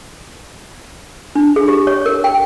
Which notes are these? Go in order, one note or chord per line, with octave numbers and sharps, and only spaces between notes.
D4
G#4
G4
C#5
A#4
G5